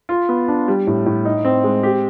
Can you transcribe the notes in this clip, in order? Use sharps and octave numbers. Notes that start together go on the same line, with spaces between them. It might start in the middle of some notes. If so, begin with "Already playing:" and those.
F4
B3
D4
G3
A2
A2
D#4
C4
G#3
G4